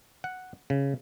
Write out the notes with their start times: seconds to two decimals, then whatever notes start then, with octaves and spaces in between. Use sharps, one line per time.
0.24 F#5
0.70 C#3